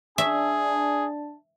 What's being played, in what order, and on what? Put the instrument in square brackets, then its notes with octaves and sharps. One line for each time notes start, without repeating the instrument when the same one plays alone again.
[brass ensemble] D4 A5 [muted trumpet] G#4 [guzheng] E5